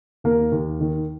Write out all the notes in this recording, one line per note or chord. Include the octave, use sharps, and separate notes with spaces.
D#2 A#3 A#4
D#2
D#3